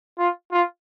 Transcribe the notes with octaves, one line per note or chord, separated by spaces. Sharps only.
F4
F4